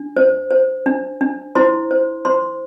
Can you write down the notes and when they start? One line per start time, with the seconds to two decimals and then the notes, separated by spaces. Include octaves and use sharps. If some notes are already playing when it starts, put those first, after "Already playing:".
Already playing: D4
0.17 C5
0.51 C5
0.86 D4
1.21 D4
1.55 E4 C5 C6
1.91 C5
2.25 C5 C6